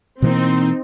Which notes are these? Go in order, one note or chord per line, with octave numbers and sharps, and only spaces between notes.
B2 E3 A#3 C4 D#4